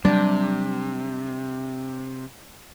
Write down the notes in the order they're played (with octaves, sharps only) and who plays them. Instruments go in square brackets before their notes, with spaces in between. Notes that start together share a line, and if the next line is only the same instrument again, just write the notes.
[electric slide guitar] C3 [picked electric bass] F#3 G3 [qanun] D4